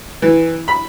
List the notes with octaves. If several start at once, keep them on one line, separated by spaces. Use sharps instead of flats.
E3
B5